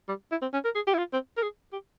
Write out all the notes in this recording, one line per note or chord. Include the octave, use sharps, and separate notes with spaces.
G3
E4
C4
C#4
A#4
G#4
G4
E4
F4
C4
A#4
G#4
G4